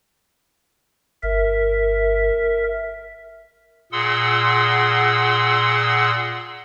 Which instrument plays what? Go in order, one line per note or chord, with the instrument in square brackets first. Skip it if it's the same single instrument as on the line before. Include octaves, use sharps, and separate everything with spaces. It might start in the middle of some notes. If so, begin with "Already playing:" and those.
[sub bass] G1 [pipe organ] A#4 E5
[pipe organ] A#2 G#4 F#5 C6 E6